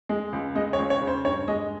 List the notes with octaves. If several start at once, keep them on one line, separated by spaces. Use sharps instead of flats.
G#3
C#2
G#3 D#5
C#5
C#2
C#5
C#3
C5
G2 C#5
G#3 D#5